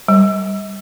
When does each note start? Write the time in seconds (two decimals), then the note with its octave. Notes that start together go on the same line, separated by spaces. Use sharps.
0.08 G3